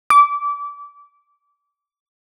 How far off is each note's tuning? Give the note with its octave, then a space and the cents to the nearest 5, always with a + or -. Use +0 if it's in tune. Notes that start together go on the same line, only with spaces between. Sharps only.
D6 -25